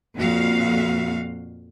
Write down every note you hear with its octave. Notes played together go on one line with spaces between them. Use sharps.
F2 A#2 F#4 F5